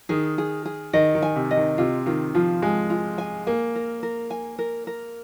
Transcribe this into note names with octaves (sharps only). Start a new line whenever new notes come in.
D#3 G#4
G#4
G#4
D#3 D#5
D#3
G#5
C3
D#5
D#3
C3 F4
D#3 F4
F3 F4
G#3 G#5
F4
G#5
A#3 G#5
A#4
A#4
G#5
A#4
A#4